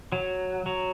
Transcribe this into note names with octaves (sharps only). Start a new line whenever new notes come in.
F#3
F#3